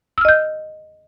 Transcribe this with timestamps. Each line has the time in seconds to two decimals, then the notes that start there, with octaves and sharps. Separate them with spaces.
0.18 E6
0.21 F6
0.25 D#5
0.28 G6